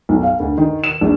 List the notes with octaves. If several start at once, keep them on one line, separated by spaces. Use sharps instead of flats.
B1
F5
D2
D#3
E7
A#1